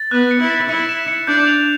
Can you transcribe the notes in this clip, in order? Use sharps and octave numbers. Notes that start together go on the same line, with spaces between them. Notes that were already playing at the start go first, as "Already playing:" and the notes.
Already playing: A6
B3 F#6
C#7
E4
A6
E4 C#7
E7
C#7
D4 G6
F7